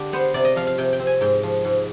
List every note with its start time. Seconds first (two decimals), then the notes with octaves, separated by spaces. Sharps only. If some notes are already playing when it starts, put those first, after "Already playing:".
Already playing: D3 G4
0.13 B3 C5
0.34 C3 D5
0.45 D#5
0.56 F3 F5
0.67 F5
0.78 C3 G5
0.93 G5
1.00 C4
1.07 G#5
1.21 G#2 G5
1.43 F3
1.65 G#2